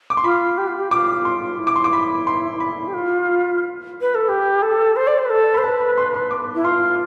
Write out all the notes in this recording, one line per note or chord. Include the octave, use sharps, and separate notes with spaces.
D6
C6
F4 B5
G4
F4
G4
F4 D6
C6
E4
D6
C6
D6
B5
C6
B5
G4
F4
B4
A4
G4 B5
A4
C5
D5
C5
B4
A4
C5 B5
B4 A5
B5
C6
C6
D6
E4
F4 C6